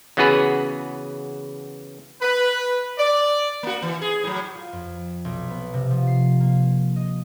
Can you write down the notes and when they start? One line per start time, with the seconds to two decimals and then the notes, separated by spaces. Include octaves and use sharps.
0.17 C#3 E3 B3 F#4 G#4 B4
2.22 B4
2.98 D5
3.63 A#3 F#4
3.82 E3
4.02 G#4
4.24 A2 F#3
4.55 F4
4.72 F2
5.25 B1
5.50 B3
5.74 C3
5.91 F3
6.07 C7
6.40 A#3
6.96 D#5